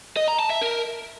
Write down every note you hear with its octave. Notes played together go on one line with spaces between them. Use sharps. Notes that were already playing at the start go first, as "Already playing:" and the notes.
D#5
A#5
A5
E5
A#4